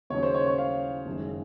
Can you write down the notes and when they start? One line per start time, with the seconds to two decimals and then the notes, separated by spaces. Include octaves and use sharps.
0.10 D#2 C#3 F#3 C#5
0.23 C5
0.34 C#5
0.46 C#5
0.58 F5
1.06 F#1 F#2 D#3 G#3